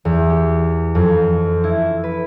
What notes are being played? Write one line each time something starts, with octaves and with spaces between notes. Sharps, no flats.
E2
G4
F2
E4
B4